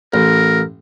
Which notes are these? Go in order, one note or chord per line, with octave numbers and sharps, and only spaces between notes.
A1 A#4